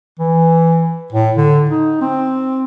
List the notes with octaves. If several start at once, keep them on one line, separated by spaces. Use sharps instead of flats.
E3
A2
D3
D#4
C4